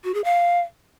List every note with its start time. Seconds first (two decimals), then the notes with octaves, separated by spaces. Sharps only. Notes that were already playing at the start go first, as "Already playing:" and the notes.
0.04 F#4
0.14 G#4
0.24 F5